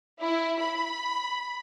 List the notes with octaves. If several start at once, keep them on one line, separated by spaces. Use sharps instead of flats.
E4
B5